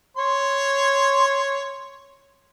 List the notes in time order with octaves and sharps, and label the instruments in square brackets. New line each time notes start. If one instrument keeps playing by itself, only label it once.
[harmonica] C#5 C6